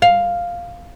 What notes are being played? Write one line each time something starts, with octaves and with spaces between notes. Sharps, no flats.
F5